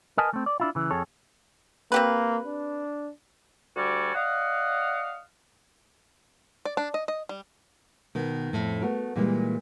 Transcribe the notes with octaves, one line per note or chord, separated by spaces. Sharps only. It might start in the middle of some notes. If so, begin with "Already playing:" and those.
A#4 B4 D#5 G#5 A5
A3 C4
D5
D4 E4 F4
C#3 E3
F2 G#4 A4 C#5
A#3 C4 G4 B4
D4
D2 G3 F#4 D5 G#5
D5 D#5 F5 F#5
D5
D4
D#5
D#5
G3
B2 D#3
F2 A2
A3 B3 F#4 A#4
A#2 E3 G3 G#3 A#3